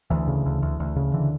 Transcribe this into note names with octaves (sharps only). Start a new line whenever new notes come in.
D2 E3
C#3
D2
D2
D2
C#3
D3 E3